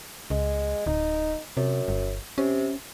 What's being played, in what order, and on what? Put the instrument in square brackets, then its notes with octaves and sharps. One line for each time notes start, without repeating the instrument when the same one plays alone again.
[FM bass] C#2 [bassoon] G#3
[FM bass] D1 [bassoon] D#4
[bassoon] F#2 [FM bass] C3
[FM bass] G1
[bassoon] C3 [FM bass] C#4